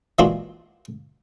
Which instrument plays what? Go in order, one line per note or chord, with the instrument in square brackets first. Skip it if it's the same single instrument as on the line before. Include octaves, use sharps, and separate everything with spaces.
[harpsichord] E3 G#3 A#3 D4 F4 F#4